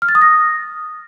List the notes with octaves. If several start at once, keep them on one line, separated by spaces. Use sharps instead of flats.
F6
A6
D#6
A#6